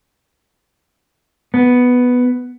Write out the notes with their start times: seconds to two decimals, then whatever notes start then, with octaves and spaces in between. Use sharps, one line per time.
1.54 B3